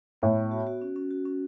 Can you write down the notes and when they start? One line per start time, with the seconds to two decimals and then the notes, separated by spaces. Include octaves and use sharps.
0.22 A2 B3
0.37 B3
0.51 F#4
0.67 F#4
0.81 C#4
0.96 C#4
1.11 F#4
1.26 C#4